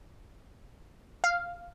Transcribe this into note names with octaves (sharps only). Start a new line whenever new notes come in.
F5